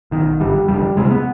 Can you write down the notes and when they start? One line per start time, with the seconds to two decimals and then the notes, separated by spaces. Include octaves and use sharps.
0.11 B1 B2 D#3
0.40 G#1 G2 D3 G3
0.68 F1 F2 D3 G3
0.96 D2 C3 G#3
1.10 B3